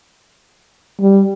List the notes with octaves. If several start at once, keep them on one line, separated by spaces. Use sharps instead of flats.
G3